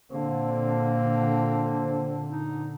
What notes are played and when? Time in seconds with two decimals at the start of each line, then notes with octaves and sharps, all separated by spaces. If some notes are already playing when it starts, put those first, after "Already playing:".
0.12 A#2 D3 A#3 C4
2.30 D#4